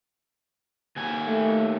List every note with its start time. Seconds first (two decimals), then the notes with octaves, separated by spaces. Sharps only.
0.96 D#2 G#5
1.27 A3